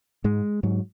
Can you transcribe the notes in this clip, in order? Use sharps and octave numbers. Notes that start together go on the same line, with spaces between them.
G#2 G#3
G#2 F#3